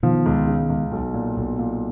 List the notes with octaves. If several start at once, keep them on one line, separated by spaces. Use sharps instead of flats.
B2 D#3 F3
C#2
C#3
C#2
B1
A#2
B1
A#2